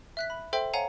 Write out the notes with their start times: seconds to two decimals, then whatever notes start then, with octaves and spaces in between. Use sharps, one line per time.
0.17 E5 F#6 B6
0.30 B5
0.53 A4 C5 E5 G5 C6
0.73 C#5 F5 F#5 G#5 A#5